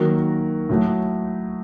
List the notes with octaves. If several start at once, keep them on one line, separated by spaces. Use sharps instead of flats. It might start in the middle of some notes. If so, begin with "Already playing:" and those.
Already playing: D#3 F#3 A#3 F#4 A#4
A2 F#3 A3